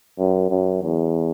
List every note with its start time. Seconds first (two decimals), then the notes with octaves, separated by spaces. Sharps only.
0.18 F#2
0.50 F#2
0.83 E2